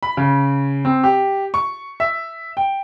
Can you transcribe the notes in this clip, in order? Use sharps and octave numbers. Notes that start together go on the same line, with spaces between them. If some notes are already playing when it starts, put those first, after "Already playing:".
B5
C#3
C4
G4
C#6
E5
G5